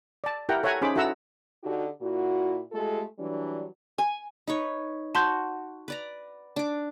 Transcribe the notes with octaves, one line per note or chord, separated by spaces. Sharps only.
D5 A5
E4 G4 A#4 F#5 G5 A#5
A4 C#5 E5 F#5 G#5 A#5
C#4 D#4 G#4 C5 B5 D6
E4 F#4 A4 F#5 A#5 E6
D3 D#4 F#4 G4
A#2 E4 F#4
G#3 A3 F4 G4 A4
E3 F#3 G3 D4
G#5
D#4 B4 C#5
F#4 A5 C6 G6
B4 D5 A#5
D4 D6